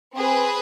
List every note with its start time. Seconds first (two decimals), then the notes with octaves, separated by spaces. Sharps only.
0.14 C4 G#4 B4